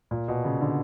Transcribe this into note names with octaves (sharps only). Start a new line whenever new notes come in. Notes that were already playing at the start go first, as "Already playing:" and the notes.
A#2
B2
C#3
D3